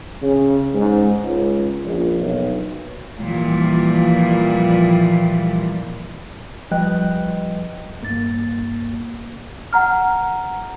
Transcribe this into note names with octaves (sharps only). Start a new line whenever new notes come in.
C#3
G#2
C#2
A#1
B1
A#2 E3 F3 G3
F3 G3 B4 D#5 G5 F#6
G2 A#3 A6
F#5 A#5 F6